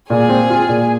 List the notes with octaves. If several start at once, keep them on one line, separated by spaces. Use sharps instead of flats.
A#2 G#4 G#5
C4
F4
A#2